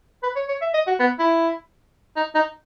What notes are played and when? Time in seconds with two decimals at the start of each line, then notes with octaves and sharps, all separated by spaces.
0.23 B4
0.36 C#5
0.48 C#5
0.62 E5
0.74 D#5
0.87 F#4
1.00 B3
1.19 E4
2.16 D#4
2.35 D#4